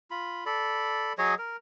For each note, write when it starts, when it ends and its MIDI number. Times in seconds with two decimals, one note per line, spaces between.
0.11 0.44 65
0.11 0.44 83
0.46 1.13 69
0.46 1.13 74
0.46 1.13 83
1.18 1.34 54
1.18 1.34 68
1.18 1.34 73
1.18 1.34 75
1.39 1.57 70